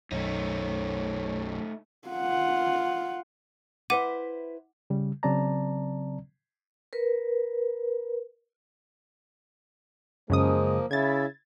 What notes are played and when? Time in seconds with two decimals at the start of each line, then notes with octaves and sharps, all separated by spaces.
0.12 B1 F#2 A3 D#4 C#5
2.08 F4 F#5
3.90 E4 B4 C5 F#5 D6 D#7
4.90 C#3 G3
5.23 C#3 F#3 C4 D5 A5 A#5
6.93 A#4 B4
10.30 F#2 C#3 F3 G#3 A#3 D#6
10.91 C#3 E4 G#6 A6